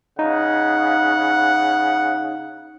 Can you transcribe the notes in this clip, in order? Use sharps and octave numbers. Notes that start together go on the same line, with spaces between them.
C#3 D#4 F#5